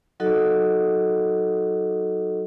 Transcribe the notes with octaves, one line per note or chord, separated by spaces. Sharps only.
F#3 D#4 F#4 A4 D#5